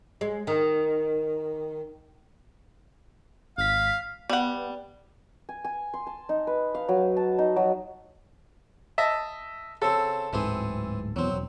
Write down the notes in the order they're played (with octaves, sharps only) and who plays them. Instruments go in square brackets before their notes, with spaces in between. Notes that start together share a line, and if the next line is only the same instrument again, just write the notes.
[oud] G#3
D#3
[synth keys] G#1 B6 [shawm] F5
[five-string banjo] G3 F#5 [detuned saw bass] B3
[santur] G#5
G#5
C6
A5
D#4
B4
F5
F#3
A5
D#4
F#3
[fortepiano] D#5 E5 A5
[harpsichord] C#3 C4 [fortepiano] A4
[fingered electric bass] D1 G#2 [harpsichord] E3 C4 G#4
[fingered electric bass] E2 B2 [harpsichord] F#3 C4
[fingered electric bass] E1